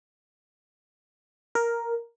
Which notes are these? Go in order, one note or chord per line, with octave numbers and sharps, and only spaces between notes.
A#4